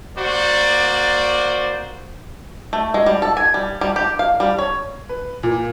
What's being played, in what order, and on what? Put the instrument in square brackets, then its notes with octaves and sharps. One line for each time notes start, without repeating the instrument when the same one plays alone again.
[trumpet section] A#3 F#4 C5 D5
[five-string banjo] A3
G#3
G3
A4
G#5
G3
G3
G4
F5
G3
C#5
[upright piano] B4
A#2